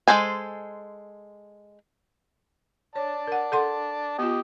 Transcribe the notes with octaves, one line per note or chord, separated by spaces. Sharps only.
G#3 D4 A4 C5 G#5
C#5 D5 A5
A#4 F#5
A4 F#5 C6
B3 F4 G4 D#5